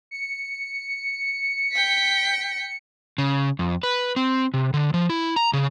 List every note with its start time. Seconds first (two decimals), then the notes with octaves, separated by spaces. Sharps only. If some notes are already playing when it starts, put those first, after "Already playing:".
0.11 C#7
1.72 G5 B6
3.18 C#3
3.59 F2
3.83 B4
4.16 C4
4.54 C3
4.74 D3
4.94 F3
5.10 E4
5.36 A#5
5.53 C#3